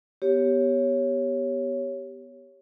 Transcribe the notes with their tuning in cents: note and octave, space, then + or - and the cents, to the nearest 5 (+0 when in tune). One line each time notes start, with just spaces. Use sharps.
B3 +0 G4 +0 C#5 +0